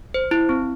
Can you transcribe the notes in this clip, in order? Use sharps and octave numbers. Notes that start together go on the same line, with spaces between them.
C5
E4
C4